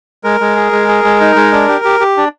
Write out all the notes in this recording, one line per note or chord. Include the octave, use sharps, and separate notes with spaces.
G#3 A#4
G#3
G#4
G#3
G#4
G#3
D#4
G#3
D4
G4
G4
G4
D4